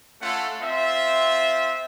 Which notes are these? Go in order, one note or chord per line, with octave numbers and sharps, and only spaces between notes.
A3 C#4 F4 A4 F#5
C4 F4 E5